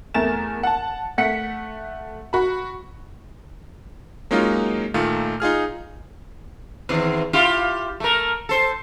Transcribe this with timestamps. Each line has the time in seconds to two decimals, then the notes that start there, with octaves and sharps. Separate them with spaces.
0.14 E2 A3 A#4 A6 E7
0.63 F#5 A5
1.18 A3 F#5 B6 C#7
2.33 F#4 B5
4.31 F#3 G#3 A#3 C#4 D#4 F4
4.94 A#2 D#3 A3 D#4 F4
5.40 D#4 F4 G#4 F6
6.89 E2 D#3 C4
7.33 E4 F4 G4
8.00 A3 A#4
8.49 A4 C5